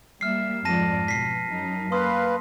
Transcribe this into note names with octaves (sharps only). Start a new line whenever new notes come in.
G3 A#3 E5 F6 C7
F2 G#2 D5 A5 A#6 D#7
B2 B6 C7
F#2 D#4
A#3 B4 F5 C6 D#6